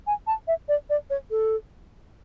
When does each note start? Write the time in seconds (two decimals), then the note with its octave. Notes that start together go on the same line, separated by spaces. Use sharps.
0.07 G#5
0.27 A5
0.48 E5
0.68 D5
0.90 D5
1.10 C#5
1.31 A4